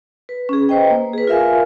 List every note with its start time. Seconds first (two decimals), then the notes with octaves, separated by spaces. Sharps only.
0.29 B4
0.49 C#4 G#4
0.69 B4 C5 D#5 G5
0.90 A#3
1.13 G#4 B4
1.27 F4 A#4 E5 F5 G#5